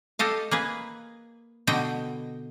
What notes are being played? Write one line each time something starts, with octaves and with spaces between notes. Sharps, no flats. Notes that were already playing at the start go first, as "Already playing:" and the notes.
G4 A4 D#5 F5
A#3 G#4 B4
B2 D3 D#5 G5